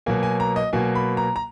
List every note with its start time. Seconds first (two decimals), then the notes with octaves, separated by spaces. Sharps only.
0.06 B2 F#3 A#3 G#5
0.23 G#5
0.40 A#5
0.56 D#5
0.73 B2 F#3 A#3 G#5
0.95 B5
1.17 A#5
1.36 A#5